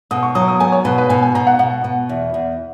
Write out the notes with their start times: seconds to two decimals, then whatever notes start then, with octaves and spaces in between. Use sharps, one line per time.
0.11 B2 D#6
0.23 C#6
0.35 F#3 D#6
0.48 D#6
0.60 B3 G#5
0.72 C#5
0.85 B2 B4
0.98 B4
1.09 B2 G#5
1.23 G#5
1.35 B2 A#5
1.47 F#5
1.59 B2 F#5
1.84 B2
2.09 E2
2.34 E2